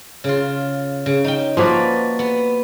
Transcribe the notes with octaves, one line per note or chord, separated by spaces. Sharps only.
C#3 F4
C#3
D#4 G5
F3 A#3 F#4 B4 D5
B3